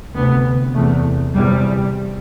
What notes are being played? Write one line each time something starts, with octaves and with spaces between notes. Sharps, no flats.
D2 C3 B3
E2 C3 A3
E2 C3 G3